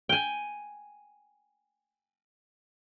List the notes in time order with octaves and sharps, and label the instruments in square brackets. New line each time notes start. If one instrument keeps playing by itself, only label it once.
[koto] G5 G#5